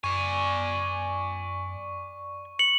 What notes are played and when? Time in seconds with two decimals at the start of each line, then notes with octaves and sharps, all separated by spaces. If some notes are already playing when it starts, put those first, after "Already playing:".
0.04 F#2 D5 G#5 C#6
2.59 C#7 F#7